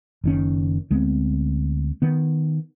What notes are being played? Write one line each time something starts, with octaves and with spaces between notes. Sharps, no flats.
F#1 D#3 C#4
D2 G#3 B3 C4
D#3 B3